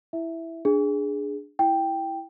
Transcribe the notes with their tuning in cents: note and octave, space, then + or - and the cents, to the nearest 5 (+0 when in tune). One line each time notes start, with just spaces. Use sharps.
E4 +0 E5 +0
D4 +0 G#4 +0
E4 +0 G5 +0